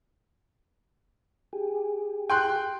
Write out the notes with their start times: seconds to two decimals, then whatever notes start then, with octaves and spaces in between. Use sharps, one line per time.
1.53 G4 G#4
2.30 G5 C6 F#6